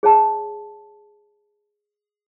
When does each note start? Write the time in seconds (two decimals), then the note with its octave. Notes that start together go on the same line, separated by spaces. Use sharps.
0.03 G#4 C#5 F#5 A5